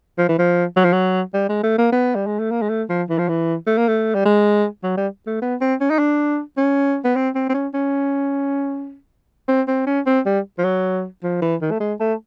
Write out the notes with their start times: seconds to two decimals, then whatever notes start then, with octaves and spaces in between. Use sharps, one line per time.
0.18 F3
0.29 E3
0.39 F3
0.77 F#3
0.84 F3
0.93 F#3
1.34 G3
1.49 G#3
1.63 A3
1.78 A#3
1.92 B3
2.15 G3
2.27 G#3
2.39 A3
2.51 A#3
2.62 G#3
2.69 A3
2.89 F3
3.09 E3
3.18 F3
3.29 E3
3.67 A3
3.77 A#3
3.88 A3
4.14 G3
4.25 G#3
4.83 F#3
4.97 G3
5.27 A3
5.42 B3
5.61 C4
5.81 C#4
5.90 D#4
5.99 D4
6.57 C#4
7.05 B3
7.16 C4
7.35 C4
7.49 C4
7.54 C#4
7.74 C#4
9.48 C4
9.68 C4
9.87 C#4
10.06 C4
10.26 G3
10.58 F3
10.64 F#3
11.23 F3
11.42 E3
11.61 D#3
11.71 A3
11.80 G#3
12.00 A3